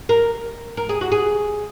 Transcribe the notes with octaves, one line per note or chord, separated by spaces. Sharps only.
A#4
A#4
G#4
F#4
G#4